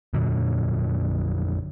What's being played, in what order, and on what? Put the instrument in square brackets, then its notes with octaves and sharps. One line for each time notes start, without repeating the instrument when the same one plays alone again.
[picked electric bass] F2 A#2 D3 F#3